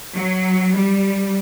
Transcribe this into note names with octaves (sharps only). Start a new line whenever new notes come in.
F#3
G3